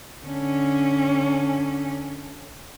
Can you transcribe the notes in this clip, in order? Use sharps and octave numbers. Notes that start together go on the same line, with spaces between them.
D3 C#4